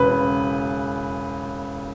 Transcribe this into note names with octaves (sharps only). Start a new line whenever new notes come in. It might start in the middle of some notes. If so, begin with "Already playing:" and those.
Already playing: E1 C#3 B4